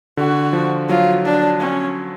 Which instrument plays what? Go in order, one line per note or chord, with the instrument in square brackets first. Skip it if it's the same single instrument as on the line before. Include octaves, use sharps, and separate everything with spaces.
[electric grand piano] D3 [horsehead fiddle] F#4
[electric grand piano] F3
[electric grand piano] F#3 [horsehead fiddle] F4
[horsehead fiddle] D4
C#4